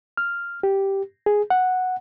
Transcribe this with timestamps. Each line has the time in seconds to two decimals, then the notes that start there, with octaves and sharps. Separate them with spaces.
0.17 F6
0.63 G4
1.26 G#4
1.50 F#5